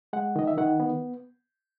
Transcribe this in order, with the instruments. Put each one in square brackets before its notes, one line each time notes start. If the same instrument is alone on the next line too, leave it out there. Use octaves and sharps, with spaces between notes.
[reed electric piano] G#3 F#5
D#3 D#5
E5
D#3 F#5
B3